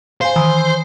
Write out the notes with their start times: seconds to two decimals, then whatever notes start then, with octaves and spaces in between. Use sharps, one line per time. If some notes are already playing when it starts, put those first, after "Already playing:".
0.21 C5 F5 G#5
0.36 D#3 E3 G#5